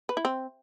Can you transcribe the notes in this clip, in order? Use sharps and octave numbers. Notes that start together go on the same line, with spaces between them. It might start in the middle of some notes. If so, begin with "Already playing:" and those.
B4
E4
C4